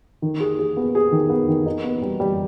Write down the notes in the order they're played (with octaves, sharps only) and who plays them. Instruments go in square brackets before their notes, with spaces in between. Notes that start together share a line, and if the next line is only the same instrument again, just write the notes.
[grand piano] D#3
G#4
G#4
B3
G#4
D#3
B3
D#3
D#4
B3
G3
G3